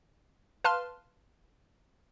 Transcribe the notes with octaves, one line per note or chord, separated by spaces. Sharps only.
B4 F5 A5 C6 F6